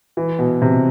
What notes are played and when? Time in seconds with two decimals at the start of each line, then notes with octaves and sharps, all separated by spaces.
0.17 E3
0.39 B2
0.62 C3